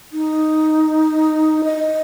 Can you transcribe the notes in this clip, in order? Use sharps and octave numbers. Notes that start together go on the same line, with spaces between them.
D#4
D#5